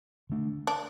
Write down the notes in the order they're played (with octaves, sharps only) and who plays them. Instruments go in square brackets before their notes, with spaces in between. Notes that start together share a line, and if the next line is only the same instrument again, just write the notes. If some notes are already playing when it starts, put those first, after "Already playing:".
[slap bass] D3 A3 D4
[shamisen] D4